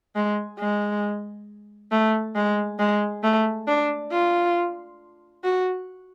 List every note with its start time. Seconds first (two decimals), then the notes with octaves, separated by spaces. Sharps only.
0.16 G#3
0.59 G#3
1.92 A3
2.36 G#3
2.79 G#3
3.23 A3
3.68 D4
4.12 F4
5.44 F#4